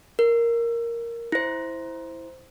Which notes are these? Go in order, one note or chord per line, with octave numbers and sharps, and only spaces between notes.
A#4
E4 C5